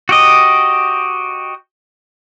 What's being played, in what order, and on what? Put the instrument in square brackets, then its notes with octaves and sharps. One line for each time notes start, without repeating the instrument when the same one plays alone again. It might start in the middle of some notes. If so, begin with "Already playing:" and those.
[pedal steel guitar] F#4 G4 D#5